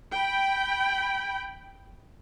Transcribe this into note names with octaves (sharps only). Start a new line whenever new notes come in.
G5 B5